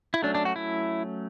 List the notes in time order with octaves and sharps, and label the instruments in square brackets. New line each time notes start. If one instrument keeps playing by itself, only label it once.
[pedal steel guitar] E4
F#3 A3 C#4 D4
D4
F#4
E4